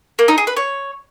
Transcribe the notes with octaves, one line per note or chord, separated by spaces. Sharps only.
A#3
D#4
G#4
B4
C#5